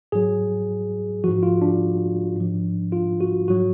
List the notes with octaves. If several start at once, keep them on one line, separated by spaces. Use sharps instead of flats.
G#2 F#3 G#4
G#2 F3 F#4
F4
D4
G#2 F3
F4
F#4
G#2 F#3 F#4